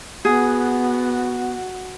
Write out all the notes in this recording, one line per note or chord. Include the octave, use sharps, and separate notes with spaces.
B3 F#4 G#4